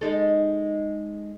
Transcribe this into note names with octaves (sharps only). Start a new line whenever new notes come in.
G#3 D#4 A4